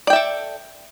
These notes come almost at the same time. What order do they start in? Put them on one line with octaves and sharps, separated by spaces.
D5 G5 E5 A4